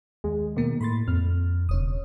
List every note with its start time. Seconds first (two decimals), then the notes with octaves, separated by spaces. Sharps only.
0.24 D#2 G#3
0.56 B2 D#3 A#3
0.81 A2 B5 C6 A6
1.08 F2 F6
1.69 E1 C#3 C#5 D#6